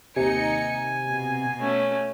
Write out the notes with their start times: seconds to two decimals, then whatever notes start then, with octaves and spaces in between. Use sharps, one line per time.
0.16 D#2 C3 D#4 G#5 C#7
1.07 B2
1.60 A3 C#4